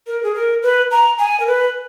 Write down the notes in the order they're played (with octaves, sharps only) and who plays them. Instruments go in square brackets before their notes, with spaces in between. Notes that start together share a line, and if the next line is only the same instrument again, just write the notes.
[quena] A#4
G#4
A#4
B4
A#5
G#5
A#4
B4